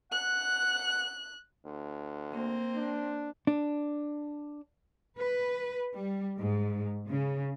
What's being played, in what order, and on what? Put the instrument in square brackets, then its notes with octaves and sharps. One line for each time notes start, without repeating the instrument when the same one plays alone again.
[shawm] F#5 [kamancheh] F#6
[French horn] D2
[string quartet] A#3 C4
[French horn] D4
[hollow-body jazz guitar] D4
[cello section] B4
G3
G#2
C#3